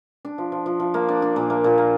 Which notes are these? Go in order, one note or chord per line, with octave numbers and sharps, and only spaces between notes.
D4
F3
F3
F3
F3
A#3
D4
D4
A#2
A#3
A#2
A#3